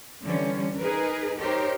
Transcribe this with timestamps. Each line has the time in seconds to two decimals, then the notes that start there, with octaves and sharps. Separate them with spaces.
0.24 D3 E3 G3 C#4
0.78 D#4 G#4 A#4 B4
1.38 D#4 G4 A#4 C5 C#5